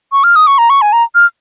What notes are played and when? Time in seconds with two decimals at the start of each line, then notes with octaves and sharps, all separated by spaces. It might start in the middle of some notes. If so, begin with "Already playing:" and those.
0.12 C#6
0.24 F6
0.36 D#6
0.47 C#6
0.58 A#5
0.70 C#6
0.82 G#5
0.93 A#5
1.15 F6